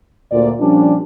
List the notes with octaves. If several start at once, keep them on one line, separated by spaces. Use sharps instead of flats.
D2 A#2 D5
A#2 F3 G3 C#4 D4